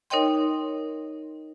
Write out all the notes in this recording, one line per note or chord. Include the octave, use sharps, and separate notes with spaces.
D#4 A#4 C#5 D#5 G5 C6